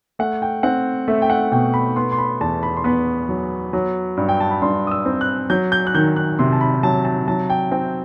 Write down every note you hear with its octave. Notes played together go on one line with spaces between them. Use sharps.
A3 F#5
G5
C4 F#5
A3 E5
G5
F#5
B2 G5
B5
B3 C6
C6
B5
E2 A5
B5
C6
B3 B5
F#3
F#3
G2
G5
A5
B5
G2 C6
D#6
E6
C4
F#6
F#3 G6
G6
F#6
D#3 G6
F#6
C3 C6
A5
B5
F#3 A5
A5
F#3 A5
G5
C4 G5